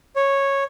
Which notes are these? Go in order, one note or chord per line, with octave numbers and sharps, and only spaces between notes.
C#5